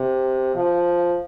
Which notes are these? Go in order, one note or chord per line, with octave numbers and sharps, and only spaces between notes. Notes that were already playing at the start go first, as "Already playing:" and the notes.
Already playing: C3
F3